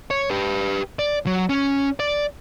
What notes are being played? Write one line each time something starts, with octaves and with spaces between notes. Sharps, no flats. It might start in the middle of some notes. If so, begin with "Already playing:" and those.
C#5
G4 B4
D5
F#3
C#4
D5